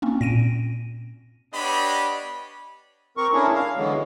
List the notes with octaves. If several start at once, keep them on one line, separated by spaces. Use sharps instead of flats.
A#3 C4 C#4
A#2 A#6 D7 D#7
B3 D4 G4 C#5 D#5 B5
C4 A#4 C#6
A3 C#4 D4 E4 G#4 A#4
F5
D3 E3 F#3 G#3 B3